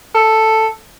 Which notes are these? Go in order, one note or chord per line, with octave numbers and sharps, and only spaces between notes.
A4